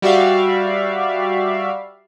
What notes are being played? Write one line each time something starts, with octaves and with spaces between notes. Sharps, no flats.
G3 F#4 G4 D5 E5 F5